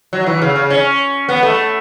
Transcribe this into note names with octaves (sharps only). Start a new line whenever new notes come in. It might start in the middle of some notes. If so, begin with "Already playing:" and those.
F#3
E3
C#3
C#3
C#4
B3
A3